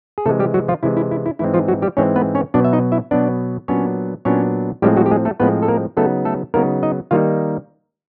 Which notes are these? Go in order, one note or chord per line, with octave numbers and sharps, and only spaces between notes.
G#4
C3 E3 G#3 A3 A4
G3 G4
F#3 F#4
F3 F4
C3 E3 G#3 E4
E4
E4
E4
G#2 E3 G#3 C4 E4
F3 F4
F#3 F#4
G3 G4
G#2 E3 G#3 C4 C#4 C#5
B3 B4
C#4 C#5
B2 F#3 B3 D4 D5
E5
D#4 D#5
E4 E5
B2 F#3 B3 D4 D5
A#2 F#3 B3 C#4 D4 C#5
A#2 F#3 B3 C#4 D4 C#5
A2 F3 G3 G#3 C4 G4
F#3 F#4
G4
G#3 G#4
A3 A4
A2 F3 G#3 B3 C4 B4
A4
A#3 A#4
C#3 F#3 A3 B3 D#4 A4
A3 A4
C#3 F#3 A#3 B3 D#4 A#4
D#4 D#5
D#3 G3 A#3 D#4 F4 F5